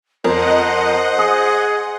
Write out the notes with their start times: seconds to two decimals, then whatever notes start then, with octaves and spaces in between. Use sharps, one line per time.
0.24 F2 A#4 C5 D#5 F#5
1.19 G#4 D#6